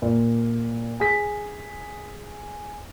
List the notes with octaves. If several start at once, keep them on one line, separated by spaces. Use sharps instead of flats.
A#2
G#4 B6